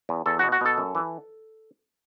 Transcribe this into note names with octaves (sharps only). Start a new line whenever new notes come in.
E2
E2 A4
F#4
B2
F#4
B2 A4
F#2
E3